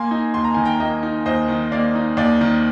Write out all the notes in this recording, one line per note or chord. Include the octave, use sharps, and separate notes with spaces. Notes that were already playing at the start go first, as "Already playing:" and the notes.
Already playing: A#3 G#5 C6
D#4
D#2 C6
A#5
D#3 G#5
G5 A#5
A#3 D#5 G5
D#4
D#2 C5 D#5
D#3
A#3 D5 F5
D#4
D#2 D5
D#3